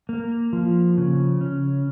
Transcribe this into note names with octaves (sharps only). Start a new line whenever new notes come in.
A#3
F3
C#3
C#4